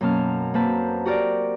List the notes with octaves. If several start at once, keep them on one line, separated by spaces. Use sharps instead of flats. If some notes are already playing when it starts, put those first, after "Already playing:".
F#2 B2 A#3 C#4 A5 F6
A#3 C4 B4 A5
F#4 G4 A#4 D5